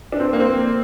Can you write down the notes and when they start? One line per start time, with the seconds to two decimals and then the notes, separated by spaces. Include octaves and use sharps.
0.12 D4
0.20 C4
0.33 A#3
0.40 C4